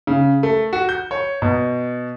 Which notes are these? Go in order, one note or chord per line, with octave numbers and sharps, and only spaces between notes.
C#3
A3
F#4
G6
C#5
B2